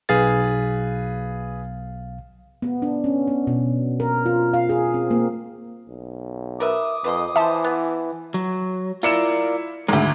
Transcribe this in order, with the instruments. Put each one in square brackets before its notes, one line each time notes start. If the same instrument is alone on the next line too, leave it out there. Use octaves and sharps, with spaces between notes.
[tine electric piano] B1 F5 A6 [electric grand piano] G#4 B4
[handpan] B3
D4
C#4
B3
B2
A#4
F4
F5
G#4
C4
A#3
[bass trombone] B1
[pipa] A#4 B4 E5 [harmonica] D6 D#6
[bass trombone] F2 [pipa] B4 C5 D#5
[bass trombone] E3 [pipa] A4 C5 [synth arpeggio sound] E5 A5
[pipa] B3
[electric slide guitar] F#3
[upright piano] E4 C#7 E7 [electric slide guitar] F4 A#4 D5
[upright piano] G#1 D2 [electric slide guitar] G#3